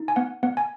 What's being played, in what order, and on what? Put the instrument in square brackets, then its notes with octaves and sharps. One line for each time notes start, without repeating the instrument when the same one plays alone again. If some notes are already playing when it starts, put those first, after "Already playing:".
Already playing: [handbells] D#4
G#5
B3 F#5
B3 F#5
G#5